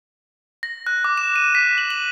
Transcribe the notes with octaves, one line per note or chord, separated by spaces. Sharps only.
A#6
F#6
D6
E7
D#7
B6
F#7
F#7